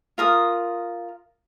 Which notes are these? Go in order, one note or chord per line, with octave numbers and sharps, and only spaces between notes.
F4 A#4 D#6